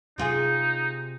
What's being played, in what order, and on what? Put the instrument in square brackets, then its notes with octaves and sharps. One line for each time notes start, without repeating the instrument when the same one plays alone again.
[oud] C3 F4 G#4 [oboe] D#4